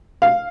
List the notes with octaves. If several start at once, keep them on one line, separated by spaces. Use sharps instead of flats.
F5